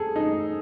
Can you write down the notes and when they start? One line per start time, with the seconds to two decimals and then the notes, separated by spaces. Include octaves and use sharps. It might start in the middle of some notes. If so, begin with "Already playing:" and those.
Already playing: G#4 A4
0.16 D#4